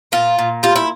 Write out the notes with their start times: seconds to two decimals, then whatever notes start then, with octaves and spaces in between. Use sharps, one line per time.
0.12 A#2 F4
0.39 A#2
0.63 G3 F4
0.76 E4